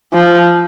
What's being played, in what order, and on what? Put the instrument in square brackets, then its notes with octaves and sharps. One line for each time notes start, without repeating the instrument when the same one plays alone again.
[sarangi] F3